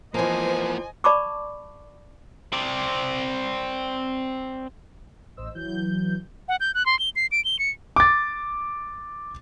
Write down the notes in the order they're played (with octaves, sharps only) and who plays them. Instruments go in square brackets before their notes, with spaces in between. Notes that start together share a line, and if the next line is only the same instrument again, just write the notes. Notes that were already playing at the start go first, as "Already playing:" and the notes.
[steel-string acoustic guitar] E3 F3 [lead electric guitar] A#3 B3 [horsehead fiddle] C5 [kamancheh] D#5 G#5
[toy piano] D5 A5 B5 C#6 D6
[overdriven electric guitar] C4 D5
[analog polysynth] A1 C5 D#5 E6
E3 F#3 G6
[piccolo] F#5
G6
F#6
C6
G7
C7
D7
G7
C#7
[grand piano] D6 A6